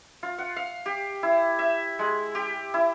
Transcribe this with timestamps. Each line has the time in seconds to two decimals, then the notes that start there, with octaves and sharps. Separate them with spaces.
0.23 F4
0.38 F#5
0.56 F5
0.86 G4
1.23 E4
1.59 E5
1.99 G#3
2.35 G4
2.74 E4